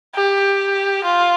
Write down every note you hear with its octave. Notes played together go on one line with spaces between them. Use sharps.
G4
F4